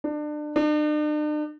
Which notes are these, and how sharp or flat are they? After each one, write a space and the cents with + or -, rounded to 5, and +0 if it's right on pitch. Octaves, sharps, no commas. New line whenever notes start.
D4 +30
D4 +45